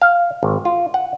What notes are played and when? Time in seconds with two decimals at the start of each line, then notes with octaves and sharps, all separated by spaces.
0.01 F5
0.43 G#1
0.65 F4
0.94 F#5